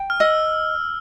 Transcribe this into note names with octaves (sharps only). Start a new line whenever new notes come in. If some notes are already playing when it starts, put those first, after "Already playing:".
Already playing: G5
F6
D#5 E6